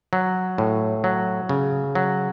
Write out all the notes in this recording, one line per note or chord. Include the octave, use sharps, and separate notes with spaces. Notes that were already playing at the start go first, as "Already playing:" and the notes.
F#3
A2
F#3
C#3
F#3